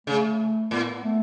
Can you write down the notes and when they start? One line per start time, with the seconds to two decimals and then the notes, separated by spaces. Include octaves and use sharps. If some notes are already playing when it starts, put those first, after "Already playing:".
0.07 C#3 A3
0.71 A2 B3
1.04 A3